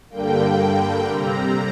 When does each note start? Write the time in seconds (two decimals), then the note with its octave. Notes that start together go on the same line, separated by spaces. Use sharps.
0.10 G2 D3 G3 A#3 G5
1.08 C3 G3 C4 A#5